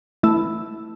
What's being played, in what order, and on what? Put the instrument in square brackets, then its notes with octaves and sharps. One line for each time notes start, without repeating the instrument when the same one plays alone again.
[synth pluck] A3 [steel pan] E4